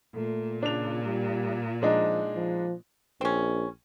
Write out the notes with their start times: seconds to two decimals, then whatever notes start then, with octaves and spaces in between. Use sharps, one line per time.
0.14 A#2 A3
0.63 C#3 D4 F7
1.05 G3
1.82 F3 G#3 D4 D#4
2.35 F3
3.21 A#1 C4 C#4